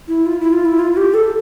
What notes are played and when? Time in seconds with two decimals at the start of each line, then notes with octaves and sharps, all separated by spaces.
0.08 E4
0.26 F4
0.39 E4
0.53 F4
0.65 E4
0.79 F4
0.97 G4
1.14 A4